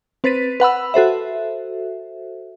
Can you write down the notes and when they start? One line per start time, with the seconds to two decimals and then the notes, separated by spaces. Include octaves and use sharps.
0.24 C4 B4 C5 A6 B6 D#7
0.60 B4 F#5 B5 E6
0.94 F#4 A4 C5 E5